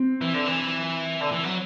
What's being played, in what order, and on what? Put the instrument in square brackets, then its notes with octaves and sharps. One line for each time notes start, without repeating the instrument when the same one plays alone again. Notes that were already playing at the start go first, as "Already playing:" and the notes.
Already playing: [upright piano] C4
[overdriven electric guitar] E3
D3
E3
D3
E3
F#3